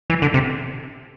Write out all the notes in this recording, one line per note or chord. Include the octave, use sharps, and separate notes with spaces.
E3
D3
C3